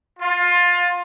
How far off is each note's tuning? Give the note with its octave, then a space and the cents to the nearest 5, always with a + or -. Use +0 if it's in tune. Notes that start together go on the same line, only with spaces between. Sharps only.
F4 +20